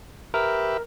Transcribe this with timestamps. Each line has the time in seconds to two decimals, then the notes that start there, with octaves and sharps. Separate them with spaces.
0.34 G4 A#4 B4 E5